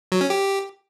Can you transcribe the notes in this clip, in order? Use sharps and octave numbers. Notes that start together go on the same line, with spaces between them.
F#3
C#4
G4